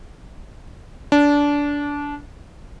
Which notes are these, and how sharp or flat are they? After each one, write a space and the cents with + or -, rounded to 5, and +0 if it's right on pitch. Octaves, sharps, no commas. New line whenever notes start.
D4 -20